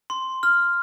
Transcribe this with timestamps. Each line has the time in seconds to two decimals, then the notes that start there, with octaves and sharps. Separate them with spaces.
0.10 C6
0.43 F6